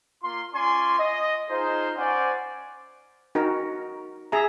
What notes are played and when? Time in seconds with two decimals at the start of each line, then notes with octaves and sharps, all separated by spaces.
0.22 A#3 F4 C6
0.54 C#4 F4 D5 G#5 C6
0.99 D#5
1.50 D#4 F4 G#4 C5
1.96 C#4 C5 D5 F#5 G#5
3.35 D#4 F#4 A#4
4.32 G#4 E5 A#5